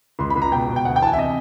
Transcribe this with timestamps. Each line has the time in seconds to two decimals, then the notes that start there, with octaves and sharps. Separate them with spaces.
0.19 C#2 C6
0.30 B5
0.36 C#2
0.42 A#5
0.52 B2 G5
0.68 B2
0.76 G5
0.85 D2 F#5
0.96 G5
1.02 E3 A5
1.07 G#5
1.13 E5
1.17 C3 D#5